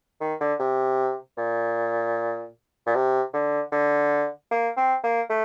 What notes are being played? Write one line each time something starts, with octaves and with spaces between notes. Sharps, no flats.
D#3
D3
C3
A#2
A#2
C3
D3
D3
A#3
C4
A#3
A3